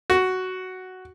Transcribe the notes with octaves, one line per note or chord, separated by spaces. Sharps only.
F#4